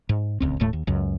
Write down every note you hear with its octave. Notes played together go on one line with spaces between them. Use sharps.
G#2
D1 C#2 C4
D#1 D#2 A2 A3
D#2
C#2 F#2